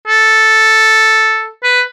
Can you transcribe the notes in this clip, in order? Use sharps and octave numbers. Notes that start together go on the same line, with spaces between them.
A4
B4